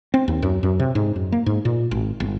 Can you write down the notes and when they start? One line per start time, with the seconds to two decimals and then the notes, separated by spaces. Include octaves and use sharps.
0.14 C4
0.28 D#2
0.42 F#2
0.63 F#2
0.80 C3
0.95 G#2
1.16 F#2
1.32 A#3
1.46 G#2
1.65 A#2
1.91 G#1
2.20 G1